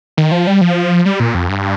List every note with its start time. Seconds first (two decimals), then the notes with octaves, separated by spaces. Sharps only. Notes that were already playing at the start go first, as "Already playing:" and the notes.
0.17 D#3
0.31 F3
0.47 G3
0.61 F3
1.06 G3
1.20 A#2
1.34 F2
1.49 G2